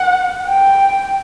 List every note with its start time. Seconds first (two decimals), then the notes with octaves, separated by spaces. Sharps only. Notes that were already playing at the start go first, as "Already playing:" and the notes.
Already playing: F#5
0.48 G5